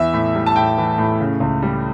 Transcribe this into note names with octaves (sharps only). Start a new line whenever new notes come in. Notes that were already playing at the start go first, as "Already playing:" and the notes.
Already playing: E2 E3 E5
A2
G3
A5
A2 G5
E3
A2
C#3
C#2
G3